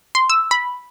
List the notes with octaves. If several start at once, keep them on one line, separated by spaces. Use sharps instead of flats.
C6
E6
B5